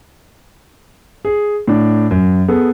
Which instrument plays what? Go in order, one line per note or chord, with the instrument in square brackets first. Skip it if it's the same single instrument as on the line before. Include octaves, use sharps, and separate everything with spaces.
[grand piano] G#4
A2 D4
F#2
B3 G#4 A4